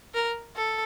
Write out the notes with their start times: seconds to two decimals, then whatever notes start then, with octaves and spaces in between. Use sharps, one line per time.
0.14 A#4
0.56 A4